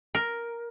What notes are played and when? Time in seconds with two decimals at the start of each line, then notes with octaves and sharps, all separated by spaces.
0.15 A#4